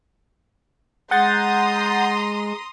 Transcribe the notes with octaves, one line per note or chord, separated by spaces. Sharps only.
G#3 F#5 A#5 C6 D#6 G6 A6